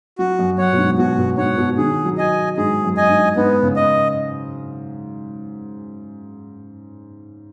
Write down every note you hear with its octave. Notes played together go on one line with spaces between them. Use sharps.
F#3 F#4
F#2
F#2 C#5 F#5
B2
G#2
B2 F#4
B2
G#2 C#5 F#5
B2
D#3 G#4
F#3
D#5 G#5
G#2 G#4
F#2
D#5 G#5
G#2
G#2 B3
C#3
D#5